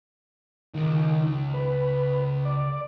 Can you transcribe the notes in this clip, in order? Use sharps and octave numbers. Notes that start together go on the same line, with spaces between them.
C#2 D#3
B4
D5